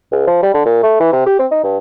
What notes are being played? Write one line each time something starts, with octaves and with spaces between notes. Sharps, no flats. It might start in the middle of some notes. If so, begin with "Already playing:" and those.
C#2
F3
G3
D3
A#2
A3
E3
C3
G4
C4
D#4
G2